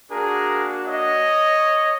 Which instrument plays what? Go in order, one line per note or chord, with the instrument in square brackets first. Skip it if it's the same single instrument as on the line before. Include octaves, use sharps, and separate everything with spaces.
[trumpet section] A#3 D4 F#4 G#4 A#4
C#5 D#5